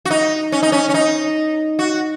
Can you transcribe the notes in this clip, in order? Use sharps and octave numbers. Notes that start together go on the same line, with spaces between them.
F#4
D#4
C#4
D#4
C#4
C#4
D#4
F#4